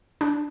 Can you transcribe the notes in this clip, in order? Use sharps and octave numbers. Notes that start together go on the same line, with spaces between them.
D4